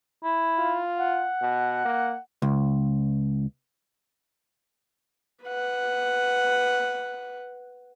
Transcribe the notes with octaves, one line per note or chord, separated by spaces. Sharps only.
E4
F4
F#5
B2
A#3
C#2
B4 F#5